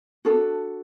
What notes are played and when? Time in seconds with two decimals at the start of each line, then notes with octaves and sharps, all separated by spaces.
0.25 D4 F#4 A4